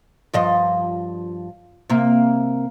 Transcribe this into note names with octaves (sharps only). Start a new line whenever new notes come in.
G2 F3 D#5
C3 A#3